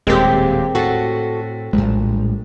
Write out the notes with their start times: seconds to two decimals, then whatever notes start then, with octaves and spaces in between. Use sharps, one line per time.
0.07 D#1 A2 G#3 A#3 C4 G4
0.75 A2 F#4 A4
1.73 A#1 A2 G3 G#3